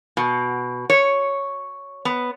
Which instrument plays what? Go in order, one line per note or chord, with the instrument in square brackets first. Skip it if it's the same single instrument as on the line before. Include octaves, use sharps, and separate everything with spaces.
[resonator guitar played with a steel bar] B2
C#5
B3